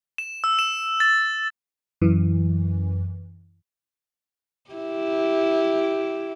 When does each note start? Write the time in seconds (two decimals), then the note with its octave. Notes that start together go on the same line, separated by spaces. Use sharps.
0.18 E7
0.44 E6
0.59 E7
1.00 A6
2.02 F#2 E3
4.71 E4 G4